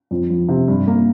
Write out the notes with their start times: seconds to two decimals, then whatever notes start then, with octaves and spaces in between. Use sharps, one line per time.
0.11 F2
0.30 F3
0.48 C3
0.68 G2
0.87 A#3